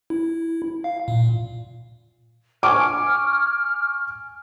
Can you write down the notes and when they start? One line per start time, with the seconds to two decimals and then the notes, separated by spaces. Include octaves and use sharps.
0.10 E4
0.84 F5
1.08 A#2
2.63 G#5 C#6 D6 F6